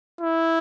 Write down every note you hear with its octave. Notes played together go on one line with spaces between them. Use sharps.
E4